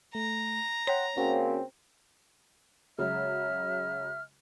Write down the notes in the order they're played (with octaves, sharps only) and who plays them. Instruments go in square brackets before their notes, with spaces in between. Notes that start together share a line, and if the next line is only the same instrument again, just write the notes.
[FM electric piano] A3 [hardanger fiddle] A#5
[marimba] C#5 [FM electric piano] F#5 G5 C6
[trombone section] C#3 A#3 C4 [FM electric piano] C#4 F#4
[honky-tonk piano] C#3 F#3 G#3 [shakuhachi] E5 [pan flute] F6